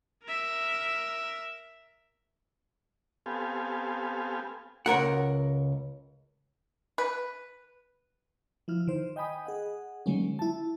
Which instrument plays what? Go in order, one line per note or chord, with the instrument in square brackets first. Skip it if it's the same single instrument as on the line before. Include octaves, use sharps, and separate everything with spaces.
[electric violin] A#4 E5
[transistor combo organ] B3 C4 G4 A4 F5 G#5
[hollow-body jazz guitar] C#2 G2 A#4 F#5
[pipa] B4
[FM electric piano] F3 E4 F6
D#3 C5
D#5 G5 G#5 B5 D#6
G#4 D#5 F#5
D3 D#3 F#3 G#3 A#3 C#4
E4 A5